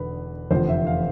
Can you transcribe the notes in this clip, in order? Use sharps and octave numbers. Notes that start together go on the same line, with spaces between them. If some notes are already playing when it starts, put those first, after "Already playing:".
Already playing: E1 E2 D3 B4
F1 E2 D3 F3 C5
E5
F5